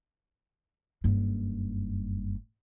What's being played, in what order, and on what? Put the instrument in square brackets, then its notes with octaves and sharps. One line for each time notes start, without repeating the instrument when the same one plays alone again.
[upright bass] F#1 G2